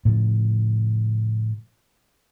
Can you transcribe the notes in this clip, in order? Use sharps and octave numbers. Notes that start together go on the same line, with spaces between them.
A2 C#3 F3